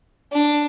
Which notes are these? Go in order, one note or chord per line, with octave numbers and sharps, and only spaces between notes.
D4